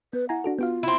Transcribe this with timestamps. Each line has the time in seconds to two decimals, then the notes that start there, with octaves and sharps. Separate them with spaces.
0.13 B3 B4
0.29 E4 F#5 G#5 A#5
0.44 D4 F#4 A4
0.59 B3 F4 F#4 F5
0.83 C4 E4